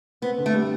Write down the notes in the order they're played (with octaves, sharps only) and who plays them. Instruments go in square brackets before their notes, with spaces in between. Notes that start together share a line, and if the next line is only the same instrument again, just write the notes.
[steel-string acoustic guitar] B3 [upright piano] C4
[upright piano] D3
[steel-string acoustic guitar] A3
[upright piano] G3